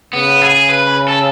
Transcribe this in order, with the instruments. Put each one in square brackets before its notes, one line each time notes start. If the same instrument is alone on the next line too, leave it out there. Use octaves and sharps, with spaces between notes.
[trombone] C#3 [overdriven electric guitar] B3
[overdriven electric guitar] G#4
B4
A4